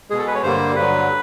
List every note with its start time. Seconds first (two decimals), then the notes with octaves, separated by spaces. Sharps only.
0.10 B2 G#3 G#4
0.18 A4
0.27 B4
0.35 C#5
0.43 G2 D3 G3 A#3 C5
0.75 G2 D3 F#3 B4